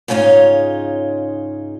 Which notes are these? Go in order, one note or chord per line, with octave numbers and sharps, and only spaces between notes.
G#2 C#3 C#4 D#4 F4